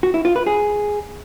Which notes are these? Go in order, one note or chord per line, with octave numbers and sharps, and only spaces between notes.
F#4
E4
F4
B4
G#4